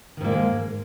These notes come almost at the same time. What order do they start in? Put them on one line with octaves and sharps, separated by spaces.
D#3 G#2 A#3 D3 G#3